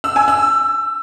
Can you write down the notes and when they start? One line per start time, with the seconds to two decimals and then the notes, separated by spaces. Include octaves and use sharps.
0.04 E6
0.16 G#5
0.28 E6